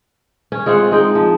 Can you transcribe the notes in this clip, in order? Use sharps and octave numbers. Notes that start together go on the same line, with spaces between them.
C#4
G#3 C4 F4 F#5
G#3 D#4 G5
F3